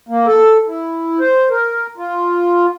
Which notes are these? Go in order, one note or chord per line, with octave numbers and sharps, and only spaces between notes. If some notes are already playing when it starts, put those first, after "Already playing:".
A#3
A4
E4
C5
A#4
F4